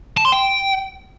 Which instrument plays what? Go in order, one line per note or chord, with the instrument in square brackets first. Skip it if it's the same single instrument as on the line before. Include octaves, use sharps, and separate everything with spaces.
[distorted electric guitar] A5
C6
G5